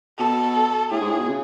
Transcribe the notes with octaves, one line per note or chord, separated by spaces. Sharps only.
B2 A4
A2 G#4
G#2
A2
B2
C#3